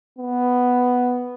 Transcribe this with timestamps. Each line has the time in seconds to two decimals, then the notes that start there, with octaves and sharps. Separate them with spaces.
0.19 B3